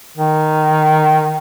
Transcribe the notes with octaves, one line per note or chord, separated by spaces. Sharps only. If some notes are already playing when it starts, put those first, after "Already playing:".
D#3